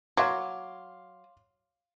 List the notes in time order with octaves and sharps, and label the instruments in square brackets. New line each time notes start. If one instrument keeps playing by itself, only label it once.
[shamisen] F#3 [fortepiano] F5 C6 D6